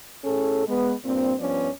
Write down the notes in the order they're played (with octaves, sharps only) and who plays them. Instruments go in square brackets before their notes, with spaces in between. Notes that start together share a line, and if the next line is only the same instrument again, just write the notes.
[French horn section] A2 C#4 G#4 A4
G#3 B3
G2 A#2 C4
G2 F3 B3 C#4 D5